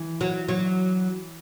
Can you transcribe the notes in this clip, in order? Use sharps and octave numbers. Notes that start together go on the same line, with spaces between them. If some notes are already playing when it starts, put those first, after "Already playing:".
Already playing: E3
F#3
F#3